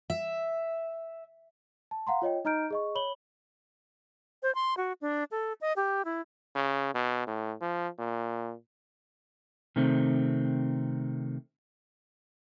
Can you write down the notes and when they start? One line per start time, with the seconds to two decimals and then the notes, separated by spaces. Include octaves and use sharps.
0.10 E5
1.91 A5
2.07 F5 F#5 A#5 C6
2.22 F4 C#5 D#5 G5
2.45 D#4 D#5 A#5 F6 G6 D7
2.71 G#4 D#5 C#6
2.95 C#5 B5 F#7 G7
4.43 C5
4.55 C6
4.77 F#4
5.01 D4
5.31 A4
5.61 D#5
5.76 G4
6.05 E4
6.55 C#3
6.95 B2
7.27 A2
7.61 F3
7.99 A#2
9.76 C3 D#3 A3 C4